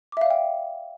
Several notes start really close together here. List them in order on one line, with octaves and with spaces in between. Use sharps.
D6 E5 F5 D5 G5